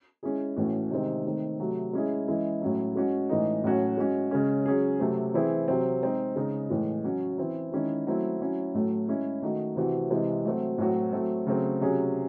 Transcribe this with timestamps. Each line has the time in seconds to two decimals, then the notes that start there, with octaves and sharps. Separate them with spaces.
0.23 G#3 C#4 E4 G#4
0.56 A2 E3 A3 C#4 F#4
0.91 C3 D#3 G#3 C4
1.25 D#3 A3 C4
1.59 C3 F#3 A3
1.93 G#3 C#4 E4 G#4
2.28 E3 G#3 C#4 E4
2.62 A2 F#3 C#4 E4
2.96 G#3 C#4 F#4
3.29 A2 E3 G#3 D#4
3.64 A2 F#3 C#4 F#4
3.97 G#3 C#4 F#4
4.31 C#3 G#3 C#4
4.66 F#3 C#4 G#4
5.00 C3 F#3 A3 C4
5.34 E3 C4 E4 G#4
5.68 C3 F#3 C4
6.03 G#3 C4 D#4
6.36 C#3 G#3 D#4
6.70 A2 E3 G#3
7.04 F#3 C#4 F#4
7.38 E3 C4 E4
7.72 D#3 G#3 C#4 E4
8.07 F#3 A3 C4 E4
8.40 F#3 C#4 E4
8.74 A2 F#3 A3
9.08 G#3 C#4 E4
9.42 D#3 A3 D#4 F#4
9.76 C3 E3 C4 F#4
10.10 C3 E3 G#3 C4 E4
10.45 F#3 A3 C4 F#4
10.78 A2 F#3 C4 F#4
11.13 F#3 A3 C4
11.47 C#3 F#3 A3 C4
11.81 C3 F#3 C#4 G#4